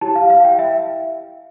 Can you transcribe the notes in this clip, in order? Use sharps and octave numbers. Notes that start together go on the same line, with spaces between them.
E4 G4 C#5 A5
F5
F5
G5
E5